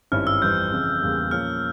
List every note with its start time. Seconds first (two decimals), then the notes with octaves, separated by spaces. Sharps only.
0.12 G#1 G2 G3 C#4 E4 F6
0.27 E6
0.41 F2 E3 G3 C4 G6
0.72 F2 C#3 E3
1.01 E2 C#3 G3 A#3
1.31 A#2 F3 A#3 C#4 F6